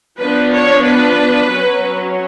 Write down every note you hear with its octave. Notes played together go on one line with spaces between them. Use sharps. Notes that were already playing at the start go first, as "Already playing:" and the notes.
F3 B3 D4 B4
C#5
B4
F#3 C#4